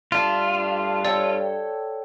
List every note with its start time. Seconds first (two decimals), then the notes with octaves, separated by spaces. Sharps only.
0.12 G2 A3 D4 F4
1.05 A4 C#5 D5 G5